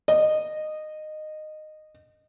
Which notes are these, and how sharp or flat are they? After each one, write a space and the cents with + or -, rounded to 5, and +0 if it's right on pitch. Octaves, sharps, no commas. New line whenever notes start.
D#5 -15